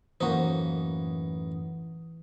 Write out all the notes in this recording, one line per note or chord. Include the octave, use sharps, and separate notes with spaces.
F#2 A2 E3 A3 A#3 D#4 F#4 C5